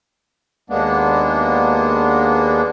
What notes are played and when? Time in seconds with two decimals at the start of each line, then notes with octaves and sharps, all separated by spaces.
0.70 D#2 G#3 A#3 B3 D4